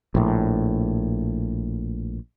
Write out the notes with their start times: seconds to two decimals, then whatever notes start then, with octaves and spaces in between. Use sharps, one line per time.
0.15 A#1 A2